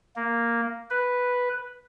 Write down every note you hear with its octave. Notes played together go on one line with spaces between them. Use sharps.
A#3
B4